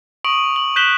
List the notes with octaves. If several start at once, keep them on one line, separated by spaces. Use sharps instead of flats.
C#6 D#6 D7 F#7
F#7
F#6 G6 B6 E7 F#7 G7